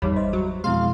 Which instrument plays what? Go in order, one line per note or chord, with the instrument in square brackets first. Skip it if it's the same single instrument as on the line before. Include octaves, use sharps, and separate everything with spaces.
[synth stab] G#1 E2 G3 [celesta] D#4 G4 C#5 [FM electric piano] B5
[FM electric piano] C5 [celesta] D#5 E5
[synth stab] F#3
[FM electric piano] F2 B2 G#3 [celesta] E4 C6 [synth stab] F5